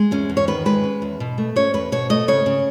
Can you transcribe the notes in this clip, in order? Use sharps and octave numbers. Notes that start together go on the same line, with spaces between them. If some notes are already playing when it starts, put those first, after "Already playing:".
Already playing: G#3
E2 C#4
E2
C#5
D#3 B4
G#3 B4
C#4
E2
B2
A3
C#4 C#5
E2 B4
B2 C#5
A3 D#5
C#3 C#5
C#3